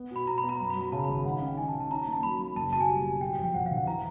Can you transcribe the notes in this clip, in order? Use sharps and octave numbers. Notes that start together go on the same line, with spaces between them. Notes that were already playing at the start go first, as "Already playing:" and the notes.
Already playing: B3
B2 B5
B2 A#5
B5
B3
A#5
F#2
B5
F#3
A#5
C#3 A5
B5
G#1
A#5
D#3 F#5
F5
C#4
G5
D#3 G#5
A5
D#3
A5
C#4 A#5
A5
A#3
A5
F#3 B5
A#3
F#1 A5
B2 A5
G#5
G3
B2
F#3 G5
G5
F2
G5
F2 F#5
F5
D3
F#5
E3 A#5